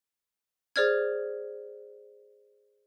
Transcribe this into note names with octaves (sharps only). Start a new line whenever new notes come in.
G#4 C5 D5 F6 G#6